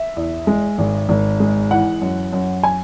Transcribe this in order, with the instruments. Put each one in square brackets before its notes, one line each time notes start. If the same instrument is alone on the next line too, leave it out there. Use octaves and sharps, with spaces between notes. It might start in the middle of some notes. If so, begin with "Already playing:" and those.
Already playing: [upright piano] E5
E2
G#3
G#1
G#1
G#3
E3 F#5
F#2
F#2
G#5